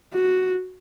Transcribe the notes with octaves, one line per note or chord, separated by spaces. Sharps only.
F#4